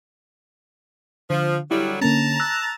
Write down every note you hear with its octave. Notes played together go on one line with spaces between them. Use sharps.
D3 F3
D3 F#3 G3 E4
D3 A#3 C#4 A5 A#5
E6 F#6 A#6